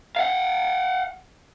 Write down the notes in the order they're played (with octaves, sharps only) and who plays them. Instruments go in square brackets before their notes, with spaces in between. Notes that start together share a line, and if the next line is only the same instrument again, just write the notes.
[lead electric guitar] F5 F#5